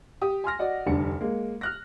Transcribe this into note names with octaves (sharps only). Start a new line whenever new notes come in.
G4 D#6
G#5 C6 F6 A#6
F#4 D5 D#5 F#5
F1 D2 G3 D4 C#7
G#3 A#3
F6 F#6 A#6